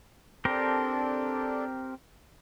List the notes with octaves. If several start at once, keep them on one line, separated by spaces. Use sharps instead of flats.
C4 D4 G4 A4 A#4